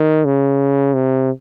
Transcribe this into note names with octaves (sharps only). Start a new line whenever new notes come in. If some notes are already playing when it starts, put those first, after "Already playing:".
Already playing: D#3
C#3
C3